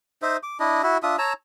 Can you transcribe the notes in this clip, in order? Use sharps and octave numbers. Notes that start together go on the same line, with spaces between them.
D#4 C5 E5
D6
D4 E4 D#5
E4 F#4 E5
D4 F4 E5 D#6
C#5 A5 A#5 E6